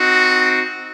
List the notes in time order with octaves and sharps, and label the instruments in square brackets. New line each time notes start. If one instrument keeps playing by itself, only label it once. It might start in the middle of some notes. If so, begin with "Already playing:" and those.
Already playing: [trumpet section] C4 D#4 F#4